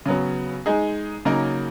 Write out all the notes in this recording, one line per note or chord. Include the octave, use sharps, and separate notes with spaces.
C#3 F#3 B3
G#3 D#4 G#4
C#3 F#3 A#3 D#4 A#4